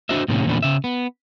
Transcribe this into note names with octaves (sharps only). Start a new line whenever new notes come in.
D4 F#4 C5 D#5 E5
A2 C3 D#3 A#3 C#4
E2 A#2 D3 C#4 D4 B4
C#3 E5
B3